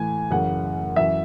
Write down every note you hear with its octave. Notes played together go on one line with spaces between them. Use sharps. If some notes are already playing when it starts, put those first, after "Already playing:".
Already playing: A2 E3 G#5
F#2 C#3 E3 F#5
F#2 E3 E5